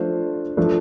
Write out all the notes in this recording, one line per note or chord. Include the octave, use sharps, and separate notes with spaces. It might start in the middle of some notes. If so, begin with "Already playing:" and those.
Already playing: F3 A3 D4 F4 C5
F3 A3 D4